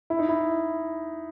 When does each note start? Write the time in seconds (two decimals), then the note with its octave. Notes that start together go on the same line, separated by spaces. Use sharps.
0.10 E4
0.19 D#4
0.29 E4